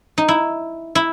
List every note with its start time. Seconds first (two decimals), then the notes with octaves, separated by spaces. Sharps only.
0.18 D#4
0.28 E4
0.95 E4